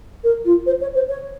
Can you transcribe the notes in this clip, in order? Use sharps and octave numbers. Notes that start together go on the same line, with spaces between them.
A#4
F4
C5
C#5
C5
C#5